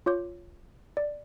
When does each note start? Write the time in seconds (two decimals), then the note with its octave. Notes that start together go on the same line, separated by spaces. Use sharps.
0.06 F4 C#5 D6 G6
0.97 D5